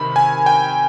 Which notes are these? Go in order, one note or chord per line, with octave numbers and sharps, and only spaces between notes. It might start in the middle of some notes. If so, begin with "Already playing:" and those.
Already playing: C3 D#3 B5
G#5
G5